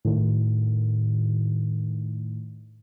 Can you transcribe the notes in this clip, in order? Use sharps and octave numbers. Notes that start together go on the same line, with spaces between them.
A2 D#3